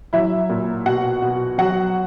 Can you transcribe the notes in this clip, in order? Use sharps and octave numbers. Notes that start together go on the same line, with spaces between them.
F#3 E4 E5
A#2
B2 F#4 F#5
B2
F#3 F#4 F#5